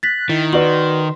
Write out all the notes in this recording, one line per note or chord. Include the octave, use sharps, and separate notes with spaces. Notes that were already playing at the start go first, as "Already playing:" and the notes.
F#6 A6 B6
D#3 E4
F#4 B4 D5 C6 F#7